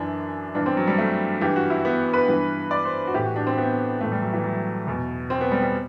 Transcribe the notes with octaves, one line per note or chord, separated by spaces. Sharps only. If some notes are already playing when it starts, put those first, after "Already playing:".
Already playing: F#2 E3 D4
G2 E3 D4
C4
F#3
G3
A3
G2 E3 G4
F#4
E4
B3
B4
G2 E3
D5
C5
F#4
A2 E3 G4
F#4
D4
C4
B3
A2 E3 A3
G3
F#3
E3
F#3
E2 B2
C4
B3
G3
G3